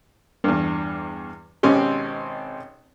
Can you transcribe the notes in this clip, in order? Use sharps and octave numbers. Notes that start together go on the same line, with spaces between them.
E2 G2
G#1 B2 C4 C#4 G4